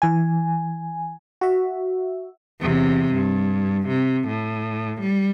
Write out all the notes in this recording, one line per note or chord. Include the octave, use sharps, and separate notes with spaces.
E3 G#5
F#4 E5
E2 C3
G2
C3
A2
G3